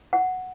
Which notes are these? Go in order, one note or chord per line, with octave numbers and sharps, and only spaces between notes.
F#5